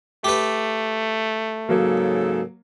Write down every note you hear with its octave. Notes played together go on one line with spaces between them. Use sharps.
A3 G4 B4
G#2 C#3 F#3 A#3 A4